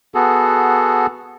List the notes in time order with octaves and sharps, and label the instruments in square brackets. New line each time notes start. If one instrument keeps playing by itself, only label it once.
[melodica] B3 F#4 G#4 A4